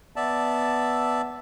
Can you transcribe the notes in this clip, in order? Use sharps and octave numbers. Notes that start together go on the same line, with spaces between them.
B3 D5 E5 A5